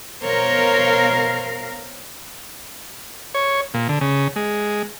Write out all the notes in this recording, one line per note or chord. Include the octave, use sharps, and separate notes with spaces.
B2 A#4 C5 C#5 F5
C#5
A#2
D3
C#3
G#3